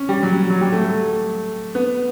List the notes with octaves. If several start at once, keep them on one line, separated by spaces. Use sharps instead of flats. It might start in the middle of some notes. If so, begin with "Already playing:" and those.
Already playing: C#4
G3
F#3
F#3
G3
A3
B3